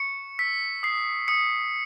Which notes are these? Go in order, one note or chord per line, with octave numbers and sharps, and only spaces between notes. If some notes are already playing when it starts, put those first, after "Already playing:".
Already playing: C#6 C#7
E6 B6
D#6 C7
D#6 C#7